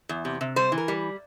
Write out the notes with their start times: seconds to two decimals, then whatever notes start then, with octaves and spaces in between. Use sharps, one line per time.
0.09 E2
0.25 C3
0.41 C3
0.56 G3 C5
0.72 E3
0.78 A#4
0.88 G3